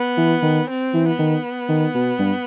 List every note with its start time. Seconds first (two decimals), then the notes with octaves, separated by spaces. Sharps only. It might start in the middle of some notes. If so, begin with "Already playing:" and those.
Already playing: B3
0.18 E3
0.43 D#3
0.69 C4
0.94 E3
1.07 B3
1.19 D#3
1.69 D#3
1.95 B2
2.19 G2